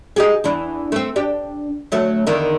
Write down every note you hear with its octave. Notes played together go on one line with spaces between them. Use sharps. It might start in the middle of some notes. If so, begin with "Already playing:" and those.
D#4 G4 G#4
E2 E3 D4
A3 C4
D4 G4
D2 F#3 A3
E2 D3 D#3